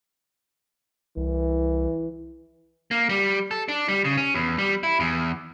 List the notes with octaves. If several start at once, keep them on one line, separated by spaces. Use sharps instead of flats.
C2 E3
A#3
G3
A4
D4
G3
C#3
C#4
E2
G3
E4
E2